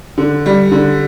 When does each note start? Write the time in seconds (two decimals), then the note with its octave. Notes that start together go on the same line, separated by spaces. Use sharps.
0.18 D3
0.46 G3
0.72 D3